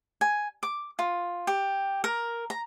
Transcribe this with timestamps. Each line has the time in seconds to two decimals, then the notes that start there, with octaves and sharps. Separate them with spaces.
0.21 G#5
0.63 D6
0.99 F4
1.47 G4
2.04 A#4
2.50 A#5